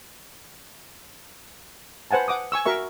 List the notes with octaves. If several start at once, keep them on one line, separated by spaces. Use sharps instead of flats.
B4 C5 F#5 G#5 A5
F#5 D6 D#6
G#5 C#6 E6
F#4 A#4 E5 C#6